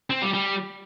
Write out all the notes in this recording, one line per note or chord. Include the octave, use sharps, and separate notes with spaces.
C4
G3
G3